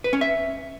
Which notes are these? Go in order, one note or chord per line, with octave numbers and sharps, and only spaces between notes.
B4
C#4
E5